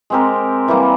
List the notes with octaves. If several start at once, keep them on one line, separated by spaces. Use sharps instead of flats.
G#3 C4 G4 A#4
E3 G3 A#3